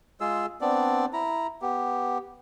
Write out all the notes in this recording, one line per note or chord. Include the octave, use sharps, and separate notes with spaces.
G#3 F4 G#4 E6
B3 C4 D4 D5
E4 A#5
B3 G4